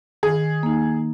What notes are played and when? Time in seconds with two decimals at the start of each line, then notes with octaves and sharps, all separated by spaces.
0.23 D#3 G#4
0.63 A#3 D#4